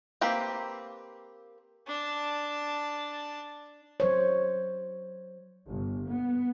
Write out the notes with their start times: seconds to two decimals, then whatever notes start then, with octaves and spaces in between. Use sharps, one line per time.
0.21 A#3 C4 G4 B4
1.87 D4 A5
4.00 F#3 C5 C#5
5.66 G1
6.08 B3